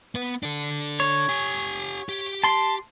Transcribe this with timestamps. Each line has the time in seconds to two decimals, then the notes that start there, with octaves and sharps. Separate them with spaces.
0.15 B3 B4
0.43 D4 A4
1.00 C#5
1.29 G4 G#5
2.09 G4
2.44 A5 C6